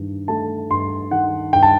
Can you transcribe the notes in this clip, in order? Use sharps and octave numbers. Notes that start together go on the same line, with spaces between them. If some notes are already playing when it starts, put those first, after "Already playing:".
Already playing: G2 D#3
A3 A5
G2 C6
D#3 F#5
G2 G5
A5